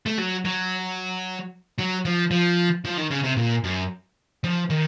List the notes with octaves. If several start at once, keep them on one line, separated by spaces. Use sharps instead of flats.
A3
F#3
F#3
F#3
F3
F3
F3
D#3
C#3
C3
A#2
F#2
F3
D#3